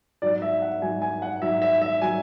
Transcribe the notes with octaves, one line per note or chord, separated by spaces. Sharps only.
G#2 F#3 D5
E5
F#5
G#2 F#3 G#5
G#5
F#5
G#2 F#3 E5
E5
E5
F#3 G#5